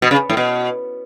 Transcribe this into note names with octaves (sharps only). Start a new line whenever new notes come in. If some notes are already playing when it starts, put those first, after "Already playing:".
B2
C#3
A2
B2